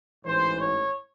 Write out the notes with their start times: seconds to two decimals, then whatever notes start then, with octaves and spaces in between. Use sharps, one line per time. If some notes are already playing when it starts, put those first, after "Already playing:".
0.25 A1 G#2 E3 C5
0.60 C#5